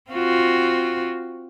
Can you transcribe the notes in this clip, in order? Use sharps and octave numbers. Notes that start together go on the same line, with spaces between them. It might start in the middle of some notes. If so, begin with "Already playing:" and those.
C4 F4 F#4